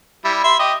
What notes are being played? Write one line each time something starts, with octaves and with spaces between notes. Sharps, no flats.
G3 E4
E5 B5 C6
G4 D#5